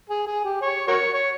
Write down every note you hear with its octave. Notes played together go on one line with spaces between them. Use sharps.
G#4
G#4
G4
C#5
F#4 A#4 C#5
C#5